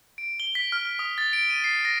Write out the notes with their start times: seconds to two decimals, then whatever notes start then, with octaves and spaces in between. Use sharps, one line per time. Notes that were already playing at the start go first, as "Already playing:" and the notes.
0.18 D7
0.40 G7
0.55 B6
0.72 F6
0.85 F6
0.99 D#6
1.18 A6
1.33 D7
1.50 D#7
1.64 C7
1.85 A#6